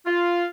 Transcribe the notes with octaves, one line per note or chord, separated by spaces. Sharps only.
F4